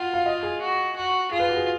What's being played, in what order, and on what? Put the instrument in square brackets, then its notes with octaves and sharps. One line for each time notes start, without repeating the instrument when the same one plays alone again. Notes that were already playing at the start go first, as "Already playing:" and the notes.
Already playing: [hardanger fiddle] F4 [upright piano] F5 F#5
[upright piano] F5
D#5
G#4
[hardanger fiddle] F#4
F#4
[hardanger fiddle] F4 [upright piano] G#4
[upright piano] B4
F#4
G#4